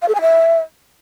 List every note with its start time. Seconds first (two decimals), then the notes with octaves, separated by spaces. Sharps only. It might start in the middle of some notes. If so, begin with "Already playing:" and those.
0.02 F5
0.08 A4
0.15 G#5
0.21 E5